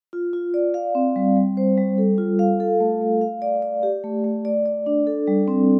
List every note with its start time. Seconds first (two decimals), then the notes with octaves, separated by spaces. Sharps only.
0.13 F4
0.33 F4
0.54 D5
0.74 F5
0.95 C4
1.16 G3
1.37 G3
1.57 C5
1.77 G3
1.98 A4
2.18 F4
2.39 F5
2.60 A4
2.80 A3
3.01 A3
3.21 F5
3.42 D5
3.62 D5
3.83 G4
4.04 A3
4.24 A3
4.45 D5
4.66 D5
4.86 D4
5.07 A4
5.27 G3
5.48 C4